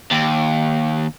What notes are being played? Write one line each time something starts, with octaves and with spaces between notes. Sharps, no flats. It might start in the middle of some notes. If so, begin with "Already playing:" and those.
D#2